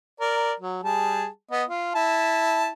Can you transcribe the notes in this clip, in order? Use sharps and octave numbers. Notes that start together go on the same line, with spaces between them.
A#4 D5
F#3
G3 G#4 A5
B3 D#5
F4
E4 A5